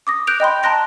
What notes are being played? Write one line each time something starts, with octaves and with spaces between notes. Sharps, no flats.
D6 D#6 A#6
F#6 G6 D7 F7
D#5 G5 B5 C6
A5 A#5 C6 F#6 A#6 D7